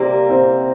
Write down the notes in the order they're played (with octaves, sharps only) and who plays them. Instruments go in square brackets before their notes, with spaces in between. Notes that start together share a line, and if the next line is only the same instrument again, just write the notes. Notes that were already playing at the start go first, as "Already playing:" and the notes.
Already playing: [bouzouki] C3 G3 A#3 [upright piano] C4
[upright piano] C4